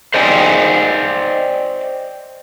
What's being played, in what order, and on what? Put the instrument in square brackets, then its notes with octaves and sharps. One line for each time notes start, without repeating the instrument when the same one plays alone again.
[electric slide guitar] C5 D5 D#5 G5 G#5